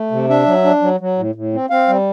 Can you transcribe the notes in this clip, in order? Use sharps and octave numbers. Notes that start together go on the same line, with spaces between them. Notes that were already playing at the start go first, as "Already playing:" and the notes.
Already playing: A3
C3
D4 E5
F#3
D4
F#3
F#3
A2
A2
C4
C4 F5
G3